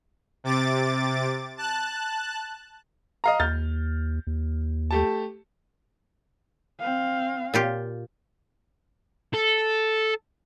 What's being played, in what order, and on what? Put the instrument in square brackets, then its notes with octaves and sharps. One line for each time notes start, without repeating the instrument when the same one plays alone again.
[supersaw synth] C3 D6 A6
A5 F#6
[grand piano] D#5 F5 A#5
[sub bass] D#2 [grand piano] F6 G6 A6
[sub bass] D#2
[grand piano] A3 G4 A5
[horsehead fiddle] C4 F5
[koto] A#2 F4 G4
[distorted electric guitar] A4